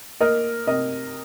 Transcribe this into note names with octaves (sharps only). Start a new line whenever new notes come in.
A#3 A#4 D#5
C3 A#4 D#5